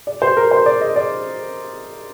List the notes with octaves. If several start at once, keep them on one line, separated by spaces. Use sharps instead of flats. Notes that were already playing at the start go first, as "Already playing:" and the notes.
D5
C5
A#4
C5
D5
D#5
D5